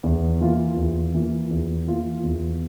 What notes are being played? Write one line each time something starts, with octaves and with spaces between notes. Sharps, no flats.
E2
E3 A#3 F4
E2
E3 A#3 F4
E2
E3 A#3 F4
E2